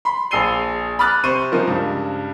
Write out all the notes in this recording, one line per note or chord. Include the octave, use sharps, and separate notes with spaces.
B5 C6
A#1 G#4 E6 C7 D#7 G7
B5 D6 D#6 F6 F#6 A6
C3 C5 C#6 D#7
C#3 F3 D#4 A#4
C#2 G2